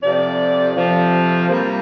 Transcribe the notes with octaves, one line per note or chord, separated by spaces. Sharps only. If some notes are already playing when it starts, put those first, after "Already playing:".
F2 C3 F3 D5
F2 C3 F3
C3 G3 A#3